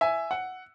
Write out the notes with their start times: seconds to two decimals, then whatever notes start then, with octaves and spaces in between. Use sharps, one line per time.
0.01 E5 G#5
0.31 F#5